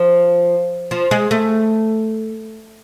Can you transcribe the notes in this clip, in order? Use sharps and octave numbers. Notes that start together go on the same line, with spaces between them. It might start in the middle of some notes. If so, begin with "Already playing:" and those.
Already playing: F3
F3
G#3
A3